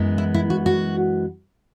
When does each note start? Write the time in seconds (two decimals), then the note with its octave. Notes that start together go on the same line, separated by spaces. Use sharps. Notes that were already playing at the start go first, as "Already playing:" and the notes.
Already playing: F#2 E3 G#3 B3
0.18 E4
0.34 E4
0.50 F#4
0.66 F#4